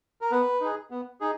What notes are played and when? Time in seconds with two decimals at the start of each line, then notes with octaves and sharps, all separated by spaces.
0.21 A#4
0.31 B3 B4
0.61 D#4 G#4
0.91 B3
1.21 D#4 G#4